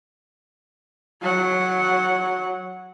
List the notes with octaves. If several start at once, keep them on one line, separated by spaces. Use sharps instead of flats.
F#3 F#5